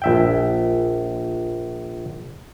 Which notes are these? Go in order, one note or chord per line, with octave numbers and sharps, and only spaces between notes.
A#1 E5 G5